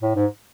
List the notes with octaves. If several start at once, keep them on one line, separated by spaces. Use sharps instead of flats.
A2
G#2